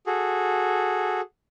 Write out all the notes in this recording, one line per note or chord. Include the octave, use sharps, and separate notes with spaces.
F#4 G#4 A4